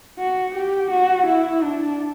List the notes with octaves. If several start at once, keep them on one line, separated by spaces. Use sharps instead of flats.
F#4
G4
F#4
E4
D4